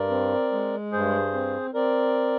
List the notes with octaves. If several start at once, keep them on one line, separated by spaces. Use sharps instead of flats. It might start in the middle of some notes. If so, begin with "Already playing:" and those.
Already playing: G2 A#4 D5
C4
G#3
G2 G#4 C5
C4
C4 A#4 D5